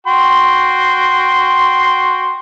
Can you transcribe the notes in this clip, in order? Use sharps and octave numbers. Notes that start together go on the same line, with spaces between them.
F#4 G5 C6